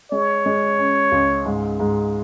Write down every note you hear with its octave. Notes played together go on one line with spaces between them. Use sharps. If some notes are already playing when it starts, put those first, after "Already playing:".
G#3 C#5
G#3
C#4
C#2
G#2
G#2